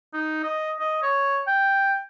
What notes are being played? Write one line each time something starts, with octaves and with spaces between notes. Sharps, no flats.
D#4
D#5
D#5
C#5
G5